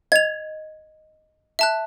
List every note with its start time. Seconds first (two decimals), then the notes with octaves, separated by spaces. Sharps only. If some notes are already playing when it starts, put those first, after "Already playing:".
0.12 D#5 G#6 F7
1.59 E5 A5 F#6